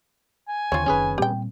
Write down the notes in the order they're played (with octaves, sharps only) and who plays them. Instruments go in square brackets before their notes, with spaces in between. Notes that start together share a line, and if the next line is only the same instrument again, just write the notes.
[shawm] G#5
[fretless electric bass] D#2 D3 [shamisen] C4 F4 [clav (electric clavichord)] C#5
[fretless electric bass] F#1 D#3 [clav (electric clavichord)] C#4 G#4 B4
[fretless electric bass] A#2 G3 C4 [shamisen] G4 G5